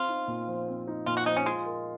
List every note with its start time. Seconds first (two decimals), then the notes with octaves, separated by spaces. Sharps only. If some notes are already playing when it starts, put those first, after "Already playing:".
Already playing: C4 F4
0.08 D#4
0.28 A#2
0.48 F3
0.68 C4
0.87 D#4
1.06 A#2 F4
1.17 F#4
1.26 F3 D#4
1.36 C#4
1.46 G#3 F4
1.66 A#4